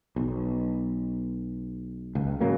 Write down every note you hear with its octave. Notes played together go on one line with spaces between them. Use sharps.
B1
C#2
G#2 C#3 F#3 A#3